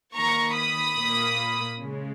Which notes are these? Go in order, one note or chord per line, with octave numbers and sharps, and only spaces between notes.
D#3 A#3 A#5 C#6
B5 D#6
A#2 A#3
C#3 G#3